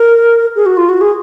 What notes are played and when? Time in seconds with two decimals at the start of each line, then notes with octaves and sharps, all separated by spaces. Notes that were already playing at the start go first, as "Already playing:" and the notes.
Already playing: A#4
0.56 G#4
0.66 F#4
0.77 F4
0.89 F#4
1.01 G#4